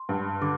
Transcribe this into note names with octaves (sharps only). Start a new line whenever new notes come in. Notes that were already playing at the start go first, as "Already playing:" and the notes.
Already playing: C6
G2
D3 D6